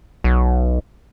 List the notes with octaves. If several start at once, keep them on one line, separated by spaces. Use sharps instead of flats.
B1